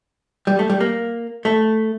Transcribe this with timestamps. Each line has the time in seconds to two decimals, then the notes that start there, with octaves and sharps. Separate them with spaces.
0.47 G3
0.59 A3
0.70 G3
0.80 A#3
1.45 A3